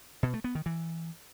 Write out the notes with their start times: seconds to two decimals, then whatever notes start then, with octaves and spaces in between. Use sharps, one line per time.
0.23 B2
0.34 A3
0.44 B3
0.55 D#3
0.66 E3